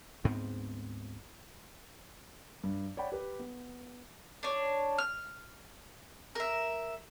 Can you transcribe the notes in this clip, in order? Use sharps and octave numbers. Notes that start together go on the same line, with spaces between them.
D2 G#2 B3 C4
G2
C#5 D5 F#5 G5 B5
G4 B4
B3
D4 C#5
F6
A#4 E5